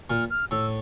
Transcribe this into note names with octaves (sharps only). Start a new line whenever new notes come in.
A#2 F6
F6
A2 E6